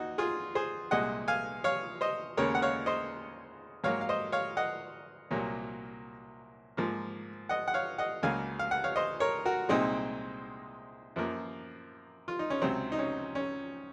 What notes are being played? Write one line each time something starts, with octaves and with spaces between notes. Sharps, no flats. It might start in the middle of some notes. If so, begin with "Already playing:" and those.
Already playing: D#2 D#4 F#4
F4 G#4
G#4 C5
C2 A#2 G#3 D#5 F#5
F5 G#5
C#5 F5
C5 D#5
D#2 C#3 G#3 A#4 C#5
F#5
C#5 F5
C5 D#5
G#2 F#3 A#3 C#5 F5
F5
C5 D#5
C#5 F5
D#5 F#5
C2 A#2 F#3 A#3
G#2 F3 A#3
D#5 F#5
F#5
C#5 F5
D#5 F#5
C#2 C#3 F#3 A#3 F5 G#5
F5
F#5
C#5 F5
C5 D#5
A#4 C#5
F#4 A#4
C2 A#2 G#3 C4 D#4
F#2 F3 A#3
F4
D#4
C#4
C#2 C3 F#3 C4
D#4
C#4
C#4